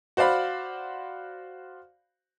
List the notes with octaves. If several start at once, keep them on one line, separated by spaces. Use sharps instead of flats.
F#4 C5 D5 F5 B5